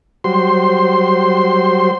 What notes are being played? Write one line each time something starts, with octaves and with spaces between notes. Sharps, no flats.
F#3 G3 C5 C6